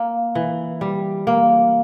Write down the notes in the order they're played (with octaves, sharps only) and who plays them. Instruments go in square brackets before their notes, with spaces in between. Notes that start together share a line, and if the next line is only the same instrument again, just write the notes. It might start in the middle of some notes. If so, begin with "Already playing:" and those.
Already playing: [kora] A#3
E3
G3
A#3